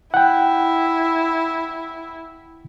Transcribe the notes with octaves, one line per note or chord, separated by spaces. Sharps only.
E4 F#5 G5